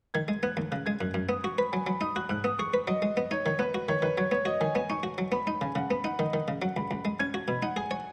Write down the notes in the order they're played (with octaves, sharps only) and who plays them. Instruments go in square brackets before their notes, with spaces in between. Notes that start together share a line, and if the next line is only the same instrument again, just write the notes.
[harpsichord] D#3 [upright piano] G#6
[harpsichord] G#3
[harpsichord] B3 [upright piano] F#6
[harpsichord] D#2
[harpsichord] C#3 [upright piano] F#6
[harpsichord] G#3 [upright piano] G#6
[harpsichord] F#2 [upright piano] F#6
[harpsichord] F#2
[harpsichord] B3 [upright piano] D#6
[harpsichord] F#4 [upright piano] C#6
[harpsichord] B4 [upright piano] B5
[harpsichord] F#3 [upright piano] G#5
[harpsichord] F#3 [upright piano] B5
[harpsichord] D#4 [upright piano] D#6
[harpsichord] F#4 [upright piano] F#6
[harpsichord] G#2 [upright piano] F#6
[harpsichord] B3 [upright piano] D#6
[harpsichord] G#4 [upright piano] C#6
[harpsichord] B4
[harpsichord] F#3 [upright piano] D#5
[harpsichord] G#3
B3
[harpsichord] D#4 [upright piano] C#5
[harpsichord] D#3 [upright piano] C#5
[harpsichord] B3 [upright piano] B4
[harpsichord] F#4
[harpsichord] D#3 [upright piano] C#5
[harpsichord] D#3 [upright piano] B4
[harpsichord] F#3 [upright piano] C#5
[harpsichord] B3 [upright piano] C#5
[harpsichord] F#4 [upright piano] D#5
[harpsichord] D#3 [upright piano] G#5
[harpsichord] B3 [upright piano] G#5
[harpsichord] D#4 [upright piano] C#6
[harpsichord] F#4
F#3
[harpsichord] B3 [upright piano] B5
[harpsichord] D#4 [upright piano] B5
[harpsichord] C#3 [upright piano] G#5
[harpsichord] C#3 [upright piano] F#5
[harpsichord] B3 [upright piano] B5
[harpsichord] D#4 [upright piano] F#5
[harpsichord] D#3 [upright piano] D#5
[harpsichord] D#3 [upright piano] D#5
[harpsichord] C#3
[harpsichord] F#3 [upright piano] F#5
[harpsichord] C#2 [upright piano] B5
[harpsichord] C#2 [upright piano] B5
[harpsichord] G#3
[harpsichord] C#4 [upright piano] G#6
[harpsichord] F#4
[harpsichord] B2 [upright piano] B5
[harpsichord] D#4 [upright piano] F#5
[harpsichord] G#4 [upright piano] G#5
[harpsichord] C#5